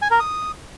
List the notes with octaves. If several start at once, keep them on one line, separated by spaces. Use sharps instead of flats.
G#5
A#4
D#6